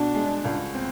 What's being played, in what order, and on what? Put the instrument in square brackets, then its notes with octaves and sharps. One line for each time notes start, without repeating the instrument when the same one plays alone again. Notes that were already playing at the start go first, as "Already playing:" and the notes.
Already playing: [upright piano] B2 [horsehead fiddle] D4
[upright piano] G#3
C#2
C4